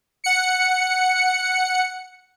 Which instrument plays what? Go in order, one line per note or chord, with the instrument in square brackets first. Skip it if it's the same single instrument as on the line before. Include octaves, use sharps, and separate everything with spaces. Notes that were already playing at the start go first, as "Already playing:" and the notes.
[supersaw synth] F#5 C#7